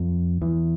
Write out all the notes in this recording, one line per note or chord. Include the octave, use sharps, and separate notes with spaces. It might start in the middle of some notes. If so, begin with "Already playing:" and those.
Already playing: F2
E2